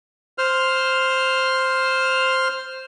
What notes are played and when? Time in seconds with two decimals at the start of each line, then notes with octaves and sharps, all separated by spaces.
0.38 C5 F6